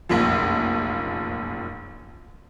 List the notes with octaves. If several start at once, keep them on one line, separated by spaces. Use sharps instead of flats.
F1 A#1 F#2 F3